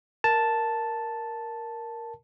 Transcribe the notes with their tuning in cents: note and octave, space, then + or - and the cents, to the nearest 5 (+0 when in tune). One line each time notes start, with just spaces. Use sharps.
A#4 +0 A5 +0